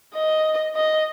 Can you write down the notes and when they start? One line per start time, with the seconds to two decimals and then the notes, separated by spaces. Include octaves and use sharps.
0.15 D#5
0.75 D#5